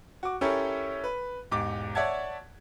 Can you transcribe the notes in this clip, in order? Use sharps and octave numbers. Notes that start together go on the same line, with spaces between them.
F#4 D6
C#4 E4 G4 A4 A#4 C#5
B4
E1 G#2 G4 D6
C#5 D5 E5 F#5 A5 G#6